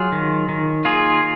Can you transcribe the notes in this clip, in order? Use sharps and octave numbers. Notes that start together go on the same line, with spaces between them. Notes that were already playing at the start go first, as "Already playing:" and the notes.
Already playing: F#3 F4 G#4
D#3
D#3
A#3 F4 G#4